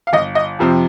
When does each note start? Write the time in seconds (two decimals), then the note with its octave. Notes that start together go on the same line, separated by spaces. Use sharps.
0.07 F5
0.13 G1 D#5
0.35 D#5
0.59 F2 C3 F3 C4